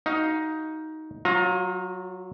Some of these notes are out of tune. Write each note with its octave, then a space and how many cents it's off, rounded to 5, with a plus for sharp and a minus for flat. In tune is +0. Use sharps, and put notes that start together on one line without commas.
D#4 +10 F#4 +15 F5 +0
F#3 +0 F4 +35 A#5 +0